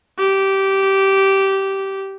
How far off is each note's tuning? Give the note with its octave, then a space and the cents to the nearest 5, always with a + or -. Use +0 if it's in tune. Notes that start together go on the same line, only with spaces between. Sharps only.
G4 -15